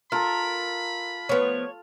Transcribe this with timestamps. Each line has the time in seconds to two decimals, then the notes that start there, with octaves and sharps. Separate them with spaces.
0.12 F4 A4 A#4 B5
1.29 F3 B3 C#5